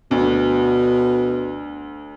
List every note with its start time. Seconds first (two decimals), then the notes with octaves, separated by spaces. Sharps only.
0.11 D2 B2